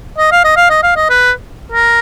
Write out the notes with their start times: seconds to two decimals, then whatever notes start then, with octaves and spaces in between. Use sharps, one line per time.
0.18 D#5
0.32 F5
0.44 D#5
0.57 F5
0.70 D#5
0.83 F5
0.96 D#5
1.10 B4
1.72 A#4